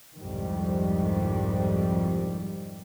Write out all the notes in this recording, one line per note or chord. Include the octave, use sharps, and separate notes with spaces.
C2 F2 G#2 D#3 G3